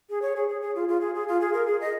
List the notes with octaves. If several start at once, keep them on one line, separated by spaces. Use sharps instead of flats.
G#4
C#5
G#4
G#4
G#4
F4
F4
G#4
G#4
F4
G#4
A#4
G#4
D#5